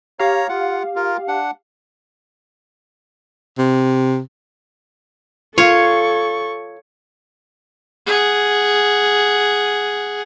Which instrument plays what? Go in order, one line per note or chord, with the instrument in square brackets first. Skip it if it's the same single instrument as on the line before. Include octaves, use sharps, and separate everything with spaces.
[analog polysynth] G4 F5 [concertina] C#5 A#5
[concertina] F4 F#5
F4 A#4
D4 F#5
[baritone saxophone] C3
[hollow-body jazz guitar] F4 [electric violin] A4 C#6 [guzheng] C#5
[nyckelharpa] G#4 F#5